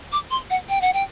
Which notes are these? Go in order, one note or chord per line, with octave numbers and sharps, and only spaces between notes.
D6
C6
F#5
G5
F#5
G5